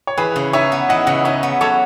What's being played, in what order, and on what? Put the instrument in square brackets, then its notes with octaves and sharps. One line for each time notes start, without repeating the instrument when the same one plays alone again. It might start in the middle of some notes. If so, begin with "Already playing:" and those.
[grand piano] C#5
[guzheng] E3 [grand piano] G#4 B4
[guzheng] C#3
[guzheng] D#4 [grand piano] C#5 E5
[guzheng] B3
[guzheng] E3 [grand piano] D#5 F#5
[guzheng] C#3 [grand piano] D#5 F#5
[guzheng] D#4 [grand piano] C#5 E5
[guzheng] B3
[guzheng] F#3 [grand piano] A4 C#5